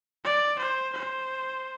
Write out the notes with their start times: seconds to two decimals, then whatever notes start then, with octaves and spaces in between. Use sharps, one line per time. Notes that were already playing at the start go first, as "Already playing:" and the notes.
0.24 D5
0.59 C5
0.93 C5